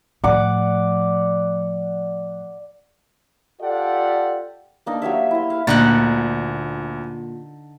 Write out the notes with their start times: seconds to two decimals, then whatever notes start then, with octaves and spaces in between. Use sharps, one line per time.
0.24 A2 F3 D5 F#5 D6
3.61 F4 G4 A4 D5 F#5
4.86 A#3 D4 D#4
5.02 F#3 G4 C#5 E5
5.31 E4 C6
5.50 F5
5.67 D2 A#2 D3 D#4 F#5 A#5 A6